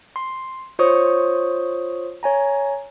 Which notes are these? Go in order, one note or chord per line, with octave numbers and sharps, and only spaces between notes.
C6
F4 C5 C#5 C#6 D#6
C#5 G#5 A#5